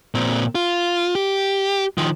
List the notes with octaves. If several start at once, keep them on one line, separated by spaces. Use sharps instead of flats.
A#2 C4
F4
G4
D#3 F3